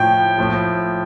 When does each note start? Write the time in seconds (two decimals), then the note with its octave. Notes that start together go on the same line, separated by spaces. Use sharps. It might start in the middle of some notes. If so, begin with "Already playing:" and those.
Already playing: A2 F3 G5
0.38 A2 F3